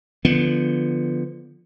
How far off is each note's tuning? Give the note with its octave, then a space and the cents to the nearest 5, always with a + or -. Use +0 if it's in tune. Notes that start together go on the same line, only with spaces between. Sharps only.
D3 +0 F3 -15 B3 +0